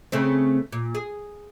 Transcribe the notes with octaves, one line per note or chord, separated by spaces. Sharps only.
C#3 A3 C4
A#2
G#4